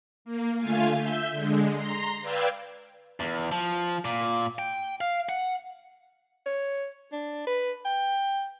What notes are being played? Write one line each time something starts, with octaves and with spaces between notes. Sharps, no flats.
A#3
D3 A3 F4 F5 G#5
E5 G6
D3 G#3
A#5 C6
B4 D5 F5 G5 E6 G#6
E2
F3
A#2
G5
F5
F#5
C#5
D4
B4
G5